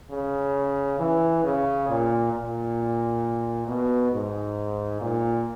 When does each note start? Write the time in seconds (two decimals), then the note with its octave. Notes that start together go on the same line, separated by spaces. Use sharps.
0.10 C#3
0.99 E3
1.44 C#3
1.89 A#2
2.33 A#2
3.68 B2
4.12 G#2
5.01 A#2